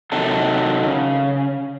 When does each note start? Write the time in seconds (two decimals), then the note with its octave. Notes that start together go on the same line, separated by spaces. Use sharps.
0.12 C3 D#3 F#3 A4
0.87 C#3